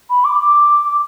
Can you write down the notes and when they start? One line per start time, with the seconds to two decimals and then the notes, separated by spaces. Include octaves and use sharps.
0.09 B5
0.24 D6
0.39 D6